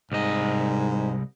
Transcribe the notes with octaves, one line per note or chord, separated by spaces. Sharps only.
C2 G#2 D#5